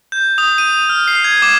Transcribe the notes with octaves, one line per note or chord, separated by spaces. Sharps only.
G6
D#6
D#7
F6
C7
G#6
D6